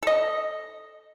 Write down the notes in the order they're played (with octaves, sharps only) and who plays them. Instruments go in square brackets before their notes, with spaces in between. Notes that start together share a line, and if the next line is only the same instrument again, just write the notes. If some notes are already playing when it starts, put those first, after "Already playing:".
[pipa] A4 D#5